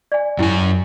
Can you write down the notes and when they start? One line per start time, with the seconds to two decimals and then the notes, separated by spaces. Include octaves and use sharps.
0.12 D5 G#5
0.39 F#2 C#4 E4 G4 G#5